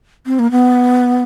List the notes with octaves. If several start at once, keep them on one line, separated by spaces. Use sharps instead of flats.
C4
A#3
B3